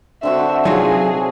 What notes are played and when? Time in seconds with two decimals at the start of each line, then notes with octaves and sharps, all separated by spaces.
0.23 D3 C4 F#4 E5
0.65 C3 F#3 D#4 F4 G#4